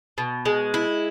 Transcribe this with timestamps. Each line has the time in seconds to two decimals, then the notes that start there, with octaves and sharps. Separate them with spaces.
0.18 B2
0.45 G#3
0.74 E4